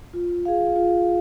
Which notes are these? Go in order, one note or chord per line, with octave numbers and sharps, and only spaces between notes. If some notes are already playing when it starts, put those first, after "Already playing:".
F4
G#4 F5
F4